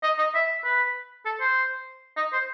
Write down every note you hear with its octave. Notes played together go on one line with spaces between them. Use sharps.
D#5
D#5
E5
B4
A4
C5
D#5
C5